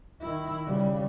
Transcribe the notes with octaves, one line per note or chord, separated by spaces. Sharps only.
D#3 E4
C#3 G3